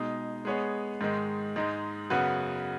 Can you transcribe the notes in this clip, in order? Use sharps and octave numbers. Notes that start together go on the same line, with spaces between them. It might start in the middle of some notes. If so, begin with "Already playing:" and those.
Already playing: B2 G#3 D#4 G#4
G#3 B3 G#4 C#5
G#2 D#3 G#3
G#2 G#3 D#4
F#2 C#3 B3 F#4 B4